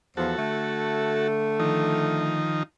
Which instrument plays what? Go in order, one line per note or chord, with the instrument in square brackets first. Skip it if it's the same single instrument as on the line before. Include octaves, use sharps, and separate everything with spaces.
[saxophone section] E2 F3 [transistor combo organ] F#4 A4
[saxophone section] D3 A3
[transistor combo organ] D#3 F3 D#4